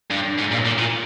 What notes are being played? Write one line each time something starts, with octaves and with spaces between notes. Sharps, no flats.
G2
G#2
A#2
A#2
A#2